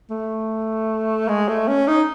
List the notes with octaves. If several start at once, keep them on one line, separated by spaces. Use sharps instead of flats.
A3
G#3
A3
C#4
D#4